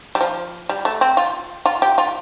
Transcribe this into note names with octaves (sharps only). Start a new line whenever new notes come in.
G3
F3
G3
A3
C4
F4
F4
G4
F4